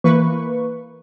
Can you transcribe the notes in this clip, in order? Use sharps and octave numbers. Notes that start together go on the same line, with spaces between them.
E3 A#3 B4 C#6